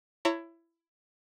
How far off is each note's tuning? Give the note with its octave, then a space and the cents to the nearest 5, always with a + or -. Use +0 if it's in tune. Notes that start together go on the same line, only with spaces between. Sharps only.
E4 +20 C#5 +0 A#5 -30